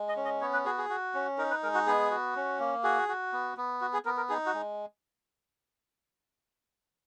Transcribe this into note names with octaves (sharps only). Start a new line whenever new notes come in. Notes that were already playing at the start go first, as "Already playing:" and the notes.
Already playing: G#3
D#5
C#4
D#5
B3 C#5
B4
F#4 G#4
G#4
F#4
C#4
D#4 A#4
B4
G#3 A#4
F#4
B3 G#4
F#4
C#4
A#3
F#4 G#4
F#4
B3
B3
F#4
G#4
B3 A#4
A#4
D#4 G#4
F#4
G#3